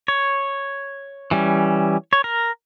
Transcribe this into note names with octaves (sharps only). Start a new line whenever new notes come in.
C#5
E3 G3 C#4
C#5
A#4